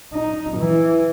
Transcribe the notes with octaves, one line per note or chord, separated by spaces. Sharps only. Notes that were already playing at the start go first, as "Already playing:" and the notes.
D#4
E3